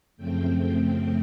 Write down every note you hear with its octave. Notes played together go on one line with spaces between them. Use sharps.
F#2 C#3 F3 A3 C4 G5